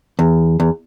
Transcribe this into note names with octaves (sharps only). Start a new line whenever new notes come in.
E2
E2